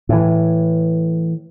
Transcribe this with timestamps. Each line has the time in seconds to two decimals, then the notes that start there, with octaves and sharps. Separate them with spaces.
0.09 A2 E3